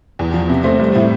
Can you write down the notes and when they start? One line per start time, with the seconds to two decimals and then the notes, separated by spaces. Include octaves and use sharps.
0.19 E2
0.34 F3
0.49 C3
0.64 A3 C5
0.79 G3
0.95 A2